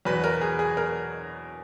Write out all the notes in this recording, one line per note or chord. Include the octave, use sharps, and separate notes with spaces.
E2 B2 F#3 B4
A#4
G#4
G#4
A#4